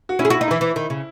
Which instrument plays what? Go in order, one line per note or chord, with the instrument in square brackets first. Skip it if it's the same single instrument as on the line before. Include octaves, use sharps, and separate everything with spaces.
[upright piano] F#4
[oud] C#4 [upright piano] E4
[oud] G#4
F#4
[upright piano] E4
[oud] D#4
[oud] E3 [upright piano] E4
[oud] E3
D#3
C#3